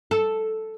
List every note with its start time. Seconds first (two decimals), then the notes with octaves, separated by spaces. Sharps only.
0.11 A4